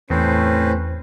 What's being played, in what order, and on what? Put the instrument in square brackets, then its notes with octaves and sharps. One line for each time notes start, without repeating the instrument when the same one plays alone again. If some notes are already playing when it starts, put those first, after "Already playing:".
[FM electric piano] E2 [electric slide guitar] A2 C4 [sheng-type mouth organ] C#4 B4 C5